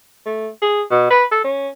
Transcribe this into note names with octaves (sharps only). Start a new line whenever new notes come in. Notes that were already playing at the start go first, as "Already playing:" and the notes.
A3
G#4
B2
B4
A4
C#4